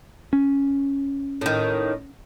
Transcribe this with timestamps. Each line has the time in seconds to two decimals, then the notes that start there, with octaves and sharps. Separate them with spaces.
0.33 C#4
1.41 A2 D#3